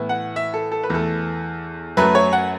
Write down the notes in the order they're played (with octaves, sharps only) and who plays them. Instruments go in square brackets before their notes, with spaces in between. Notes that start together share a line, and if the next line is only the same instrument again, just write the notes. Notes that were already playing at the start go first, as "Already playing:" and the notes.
Already playing: [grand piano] A2 E3 B3
F#5
E5
A4
A4
B4
E2 E3 A3 A4
F#2 F#3 A3 B4
C#5
F#5